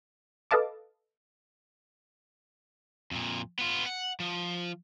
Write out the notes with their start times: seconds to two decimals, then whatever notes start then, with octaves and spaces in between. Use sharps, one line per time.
0.51 A4 B4 D#5 F5 A5 D6
3.11 F2 A#2
3.59 B3 F4
3.86 F#5
4.20 F3